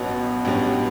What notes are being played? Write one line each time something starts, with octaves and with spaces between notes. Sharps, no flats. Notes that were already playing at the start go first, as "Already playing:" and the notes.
Already playing: A1 G2 B2 F#3 C#4
A1 G2 F#3 C#4 G4